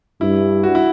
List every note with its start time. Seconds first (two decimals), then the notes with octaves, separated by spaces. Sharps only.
0.21 G2 E4
0.63 F#4
0.75 E4